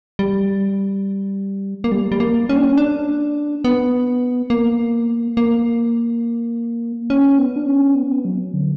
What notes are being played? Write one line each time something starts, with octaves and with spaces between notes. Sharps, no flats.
G3
A#3
G3
G3
A#3
C#4
D4
C#4
D4
B3
A#3
A#3
C#4
B3
D4
C#4
B3
C#4
B3
F#3
D3